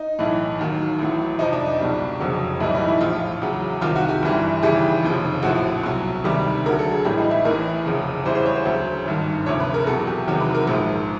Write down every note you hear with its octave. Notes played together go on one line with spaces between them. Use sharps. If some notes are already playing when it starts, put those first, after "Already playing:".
Already playing: D#4
B1 A2 E3
D#2 D#3 F#3
A1 A2 F#3
F2 C3 F3 D#4
D4
D#4
C#2 B2 G3 D4
F1 F2 C#3 F#3
B1 A2 E3 G3 D#4
D#4
E4
A#1 A2 F3 F4
E2 C#3 F#3
C2 C3 D#3 F4
F#4
G4
G1 G2 E3 G3
D#2 C#3 E3 G3 G4
F1 D#2 C#3 F3
A#1 A2 F3 F#4
C2 B2 F#3
D2 C3 D#3 G3
D2 D3 F#3 A#4
A4
G#4
A1 A2 E3 G3 G4
D#4
E4
A1 A2 E3 A#4
F1 E2 C#3 F3
E2 C#3 E3 G3 C5
C5
C#5
C5
D2 C#3 F#3
G#1 G2 D#3
D2 C3 F3 C#5
B4
A#4
E2 B2 F#3 A4
G4
E2 C3 D#3 F#3
B4
A#4
A#1 G#2 F3